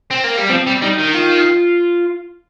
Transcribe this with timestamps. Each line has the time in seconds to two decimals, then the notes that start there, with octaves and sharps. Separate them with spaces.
0.11 C4
0.24 A#3
0.37 G3
0.50 F3 C4
0.67 G3
0.82 G3 D#4
0.99 D#3
1.14 F4